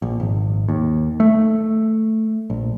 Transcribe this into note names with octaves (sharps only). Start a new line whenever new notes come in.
A#1
G#1
D#2
A3
A#1